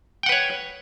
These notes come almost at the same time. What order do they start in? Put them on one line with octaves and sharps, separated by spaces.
G5 F#5 B4 C#5